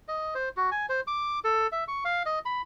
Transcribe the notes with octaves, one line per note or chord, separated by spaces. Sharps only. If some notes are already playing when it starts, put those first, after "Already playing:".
D#5
C5
F#4
G#5
C5
D6
A4
E5
C#6
F5
D#5
B5